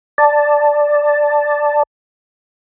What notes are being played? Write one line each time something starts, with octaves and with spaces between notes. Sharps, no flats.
D5 A5